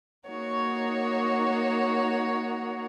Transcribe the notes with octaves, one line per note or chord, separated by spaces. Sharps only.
A#3 D#4 F#4 C#5